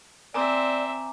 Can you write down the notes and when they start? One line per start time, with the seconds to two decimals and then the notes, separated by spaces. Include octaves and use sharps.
0.34 C4 D5 E5 G#5 A#5 D6